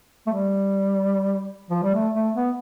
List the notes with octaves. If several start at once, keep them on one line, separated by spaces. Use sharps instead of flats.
A3
G3
F3
G3
A3
A3
B3